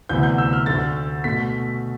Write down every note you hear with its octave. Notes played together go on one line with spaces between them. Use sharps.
D2 C3 E3 B3 G6
G6
E6
F6
D2 D3 A3 A6
B2 A3 B6